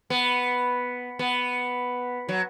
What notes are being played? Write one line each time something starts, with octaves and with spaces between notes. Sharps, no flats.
B3
B3
F#3